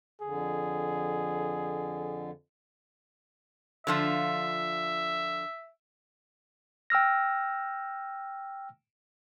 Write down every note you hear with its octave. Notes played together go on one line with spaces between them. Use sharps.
F2 D3 G#4
D3 F3 F4 E5
G5 E6 F6 A#6